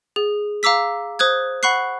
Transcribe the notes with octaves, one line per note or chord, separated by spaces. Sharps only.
G#4
F5 A#5 D6 E6 B6
C5 D#6 F#6 G#6
F#5 B5 C#6 F#6 C7